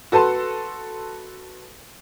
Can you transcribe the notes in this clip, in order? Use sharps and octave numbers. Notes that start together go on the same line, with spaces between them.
F#4 A4 B4 A5 C6